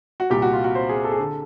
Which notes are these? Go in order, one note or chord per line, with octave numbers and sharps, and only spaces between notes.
F#4
C2 A#2 G4
F#4
F4
F#4
C5
G#4
A4
G#4
D3 A4